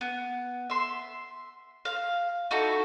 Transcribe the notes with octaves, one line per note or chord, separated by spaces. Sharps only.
B3
E5 C6
F5
D#4 E4 F#4 A4